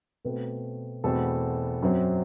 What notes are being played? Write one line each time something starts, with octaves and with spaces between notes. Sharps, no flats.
B2 A3 C4 B4
E2 B2 A3 C4 A4
F#2 F#3 C4